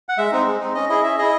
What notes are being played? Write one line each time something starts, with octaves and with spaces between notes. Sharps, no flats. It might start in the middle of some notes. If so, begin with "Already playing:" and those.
F#5
G#3 E5
C4 D#4
G#3
C4 D#4
C#4 D#5
E4 G#4 D#5
C#4 E5
E4 G#4 D#5